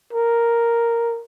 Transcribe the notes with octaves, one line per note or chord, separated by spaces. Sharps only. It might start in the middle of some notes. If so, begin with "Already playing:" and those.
A#4